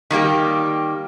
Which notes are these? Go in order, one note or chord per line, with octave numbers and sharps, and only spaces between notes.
D#3 G3 A#3 G4